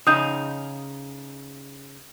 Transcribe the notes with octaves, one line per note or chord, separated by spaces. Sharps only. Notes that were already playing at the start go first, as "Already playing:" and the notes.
C#3 D#4 D#6 G6